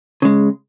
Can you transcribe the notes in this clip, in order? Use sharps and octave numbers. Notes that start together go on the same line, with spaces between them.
C#3 G#3